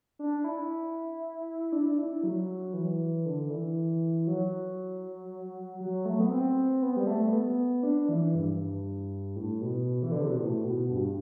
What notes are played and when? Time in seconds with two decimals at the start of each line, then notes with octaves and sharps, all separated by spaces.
0.19 D4
0.44 E4
1.72 D4
1.98 E4
2.23 F#3
2.74 E3
3.26 D3
3.50 E3
4.27 F#3
5.80 F#3
6.05 A3
6.20 B3
6.31 C4
6.82 B3
6.96 G3
7.07 A3
7.33 B3
7.83 D4
8.09 E3
8.35 G2
9.36 A2
9.61 B2
10.03 E3
10.12 D3
10.21 C3
10.29 B2
10.39 A2
10.64 B2
10.90 G2